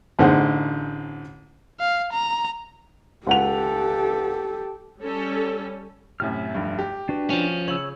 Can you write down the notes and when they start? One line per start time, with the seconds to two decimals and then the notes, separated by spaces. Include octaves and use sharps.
0.19 A1 D3 D#4 G#4 C5 F#5
1.80 F5
2.12 A#5
3.27 C#2 G4 A4 F#5 F7
5.00 G3 C#4 A4
6.20 F#2 A2 C3 E5 F6
6.55 F1 G2
6.79 G4
7.09 D4 F#4 B4
7.30 F3 C#4
7.68 C#3 C#5 E6 F#7